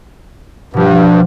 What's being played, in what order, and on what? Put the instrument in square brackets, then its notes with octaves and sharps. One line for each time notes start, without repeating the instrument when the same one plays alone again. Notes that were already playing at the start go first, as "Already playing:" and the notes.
[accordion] G2 [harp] B2 F3